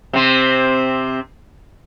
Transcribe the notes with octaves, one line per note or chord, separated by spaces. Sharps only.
C3 C4